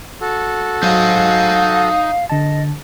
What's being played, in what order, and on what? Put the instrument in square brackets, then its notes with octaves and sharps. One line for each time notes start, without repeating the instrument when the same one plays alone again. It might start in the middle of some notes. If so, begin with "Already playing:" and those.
[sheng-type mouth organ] F#4 A4
[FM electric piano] F#3 [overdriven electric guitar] D#4 C5 [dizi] F5
[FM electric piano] D3 A5 [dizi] D#5